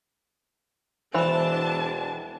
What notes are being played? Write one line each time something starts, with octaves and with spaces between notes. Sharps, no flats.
E1 E3 D4 C5 A5 B5